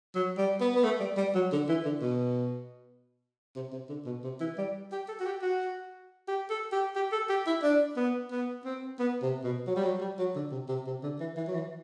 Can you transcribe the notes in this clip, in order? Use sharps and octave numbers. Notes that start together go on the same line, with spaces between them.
F#3
G3
B3
B3
A3
G3
G3
F#3
D3
E3
D3
B2
C3
C3
D3
B2
C3
E3
G3
G4
A4
F#4
G4
F#4
G4
A4
G4
G4
A4
G4
E4
D4
B3
B3
C4
B3
C3
B2
F#3
G3
F#3
G3
F#3
D3
C3
C3
C3
D3
E3
E3
F#3
E3